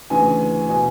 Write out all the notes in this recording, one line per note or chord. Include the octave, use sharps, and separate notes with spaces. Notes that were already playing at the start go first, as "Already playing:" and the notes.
D2 C#3 E3 G#5
B2 G#5